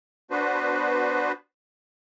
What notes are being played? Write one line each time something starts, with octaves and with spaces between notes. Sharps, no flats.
B3 D4 F#4 B4 C5